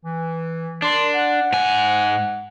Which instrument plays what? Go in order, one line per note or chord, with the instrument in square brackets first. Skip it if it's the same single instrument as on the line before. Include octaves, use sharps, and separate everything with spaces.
[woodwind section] E3
[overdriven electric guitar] D4 [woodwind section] A#4 C6
[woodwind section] F#5
[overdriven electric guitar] G#2 G#5